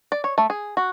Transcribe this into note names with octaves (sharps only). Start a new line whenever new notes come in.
D5
C#5
A3
G#4
F#4